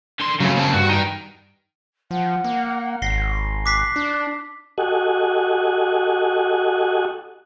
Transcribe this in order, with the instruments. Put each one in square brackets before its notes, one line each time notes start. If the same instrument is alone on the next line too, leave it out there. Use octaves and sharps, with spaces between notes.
[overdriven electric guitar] D3 C6
[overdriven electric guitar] C#3 [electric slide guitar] F#3 A3 C#4
[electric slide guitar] A#3 C4 A5
[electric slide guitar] G2 [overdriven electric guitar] F#4
[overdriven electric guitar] D#4 G5
[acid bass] F3 [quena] F#5
[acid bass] A#3
[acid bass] G#1 [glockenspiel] A#6 C7 G7
[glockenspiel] D6 B6 C7 [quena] F#6
[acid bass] D4
[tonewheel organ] F#4 G4 A4 D#5 F#5 G#5